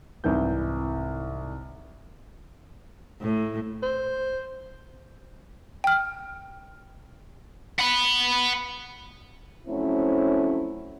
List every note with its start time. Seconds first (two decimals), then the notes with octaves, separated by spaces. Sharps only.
0.24 C2 G#2 C3 E3 G6
3.22 A2
3.83 C5
5.84 G5 F6
7.79 F#5 B5
9.67 F3 F#3 A3 C4 C#4 E4